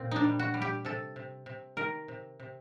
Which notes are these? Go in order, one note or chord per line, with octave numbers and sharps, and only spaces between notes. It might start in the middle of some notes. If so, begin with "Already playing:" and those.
Already playing: A#2 C4
D4 D#4
G3
F#4
G3
G4
C3 A4
C3
C3
D#3 A#4
C3
C3